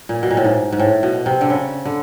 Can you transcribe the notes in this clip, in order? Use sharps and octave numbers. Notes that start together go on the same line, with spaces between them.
A#2
B2
A#2
A2
G#2
G#2
A2
B2
C3
D3
C#3
D3